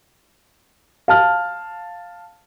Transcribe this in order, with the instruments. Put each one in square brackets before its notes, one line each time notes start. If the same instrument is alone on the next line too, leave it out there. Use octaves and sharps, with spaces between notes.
[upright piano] F5 A5 F6